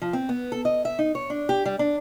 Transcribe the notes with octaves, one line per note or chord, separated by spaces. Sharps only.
F3
C4
B3
A4
D#5
E5
D#4
C#5
D4
G4
G3
D4